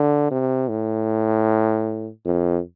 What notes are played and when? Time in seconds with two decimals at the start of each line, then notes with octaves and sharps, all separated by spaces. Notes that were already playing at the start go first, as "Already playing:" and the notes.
Already playing: D3
0.31 C3
0.69 A2
2.25 F2